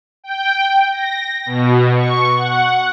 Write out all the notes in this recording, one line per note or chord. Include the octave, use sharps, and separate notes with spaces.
G5
A#6
B2
C#6
F#5